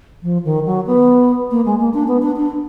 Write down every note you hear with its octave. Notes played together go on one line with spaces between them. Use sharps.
F3
D#3
F#3
B3
A#3
G#3
A#3
D4
B3
D4
D4